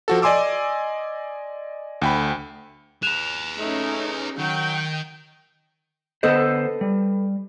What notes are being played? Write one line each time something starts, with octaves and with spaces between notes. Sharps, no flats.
F3 F#4 A4
D5 D#5 G#5 C6 D6 E6
D2 G5 B5
G#4 B4 F#6 E7 F7
A3 C#4 D#4
D#3 F#3 G5
D3 B3 A4 B4 C5 D#5
G3